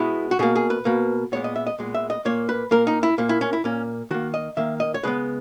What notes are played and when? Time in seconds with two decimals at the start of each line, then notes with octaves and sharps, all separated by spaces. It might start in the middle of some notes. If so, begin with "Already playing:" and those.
Already playing: B2 G#3 B3 E4
0.31 F#4
0.39 B2 A#3 G#4
0.56 G#4
0.70 B4
0.85 B2 A#3
1.32 A#2 G#3 B3 C#5
1.44 D#5
1.56 E5
1.67 D#5
1.79 A#2 G#3 B3
1.94 E5
2.10 D#5
2.25 A#2 A#3 C#5
2.49 B4
2.71 A#2 A#3 A#4
2.87 D#4
3.03 E4
3.18 A#2 A#3
3.29 E4
3.41 C#4
3.53 E4
3.64 A#2 A#3 C#4
4.11 D#3 A#3 F#4
4.34 D#5
4.57 D#3 A#3 E5
4.80 D#5
4.94 C#5
5.03 C#3 G#3 B3 B4